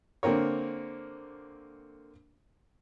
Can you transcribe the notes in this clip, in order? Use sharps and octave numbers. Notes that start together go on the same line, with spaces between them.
D3 A#3 C4 A#4 C#5